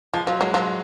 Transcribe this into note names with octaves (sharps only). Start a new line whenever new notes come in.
F3 G#3
F3 F#3
F#3 G#3
F3 F#3